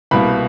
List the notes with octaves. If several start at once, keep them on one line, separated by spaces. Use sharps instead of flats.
C2 B2 G3 A#3 B5